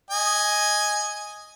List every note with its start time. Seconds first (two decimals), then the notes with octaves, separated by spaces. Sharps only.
0.10 D#5 G#5